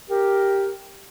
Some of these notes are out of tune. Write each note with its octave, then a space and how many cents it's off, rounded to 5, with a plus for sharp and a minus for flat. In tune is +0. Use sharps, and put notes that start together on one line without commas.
G4 +0 A#4 +0